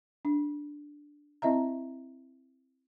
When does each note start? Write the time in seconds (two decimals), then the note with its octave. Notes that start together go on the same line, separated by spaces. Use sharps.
0.25 D4
1.42 C4 E4 D#5 E5 A#5